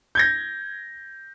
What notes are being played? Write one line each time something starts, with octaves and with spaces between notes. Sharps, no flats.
G6 G#6 A#6